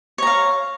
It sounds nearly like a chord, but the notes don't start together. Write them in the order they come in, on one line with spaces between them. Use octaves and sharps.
C#5 A#5 F5